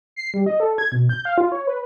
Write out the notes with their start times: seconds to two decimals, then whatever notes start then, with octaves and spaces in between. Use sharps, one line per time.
0.16 C7
0.34 G3
0.46 D#5
0.60 A4
0.78 G#6
0.92 B2
1.09 G6
1.25 F5
1.38 F4
1.52 C#5
1.67 B4